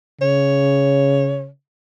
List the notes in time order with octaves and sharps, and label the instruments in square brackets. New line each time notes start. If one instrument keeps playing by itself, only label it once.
[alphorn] C#3 [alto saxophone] C#5